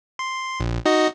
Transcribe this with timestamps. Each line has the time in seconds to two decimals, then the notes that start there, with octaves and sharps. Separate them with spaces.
0.19 C6
0.60 A#1
0.85 D#4 F#4 D#5